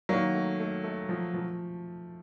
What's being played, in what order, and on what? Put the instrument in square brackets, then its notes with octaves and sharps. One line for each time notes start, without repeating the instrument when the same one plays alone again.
[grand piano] D#3 [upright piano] F#3 A#3
[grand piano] A3
A3
A3
F3
F3